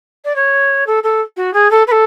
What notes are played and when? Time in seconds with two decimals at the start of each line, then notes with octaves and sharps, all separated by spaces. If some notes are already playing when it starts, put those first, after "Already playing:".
0.24 D5
0.35 C#5
0.86 A4
1.03 A4
1.36 F#4
1.53 G#4
1.70 A4
1.87 B4
1.91 A4